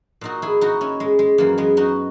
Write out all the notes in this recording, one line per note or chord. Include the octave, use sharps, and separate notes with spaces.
A#2 D#4 F#4
E4 G#4
D#4 F#4
C#4 E4
G#3
G#3
F#2 E3 A#3
G#3 B3
D#4 F#4